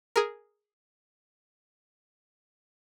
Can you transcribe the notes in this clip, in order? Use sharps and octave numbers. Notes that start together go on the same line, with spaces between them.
G#4 A#4